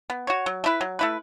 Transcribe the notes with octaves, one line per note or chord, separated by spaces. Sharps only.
B3
F#4 C#5
F#3
A3 E4 B4
F#3
A3 E4 B4